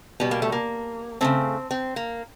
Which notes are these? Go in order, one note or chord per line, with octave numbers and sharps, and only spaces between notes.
B2 G3 B3
A#3
A3
A#3
C#3 F3 A3 C4
C4
A#3